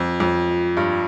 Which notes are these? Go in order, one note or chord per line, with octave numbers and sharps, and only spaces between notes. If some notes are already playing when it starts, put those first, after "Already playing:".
Already playing: F2
F2
G2